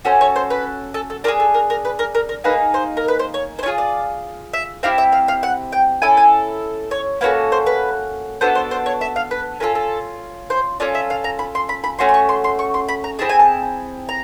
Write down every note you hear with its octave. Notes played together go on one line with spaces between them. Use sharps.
C#4 F#4 A4 C5
C#5
C5
B4
A4
A4
D4 F4 G#4 A#4
A4
A#4
A#4
B4
A#4
A#4
A#4
A#3 D#4 G#4 B4
C5
A#4
B4
C5
C#5
C5
C#4 C#5
F4 G#4
D5
E5
C4 E4 G4 F5
E5
F5
F5
F#5
G5
C#4 E4 A4 G#5
G#5
C#5
A#3 C#4 F#4 A4 B4
C5
B4
B3 D4 F#4 A4 C5
C5
C5
C#5
E5
F5
B4
C#4 F4 A4 A#4
A4
C5
C#4 F4 A4 D5
E5
F5
A#5
B5
C6
B5
B5
A3 C#4 F#4 C6
C6
C#6
C6
C6
C#6
C6
B5
A#5
C4 E4 G#4 A5
G#5
A5
A#5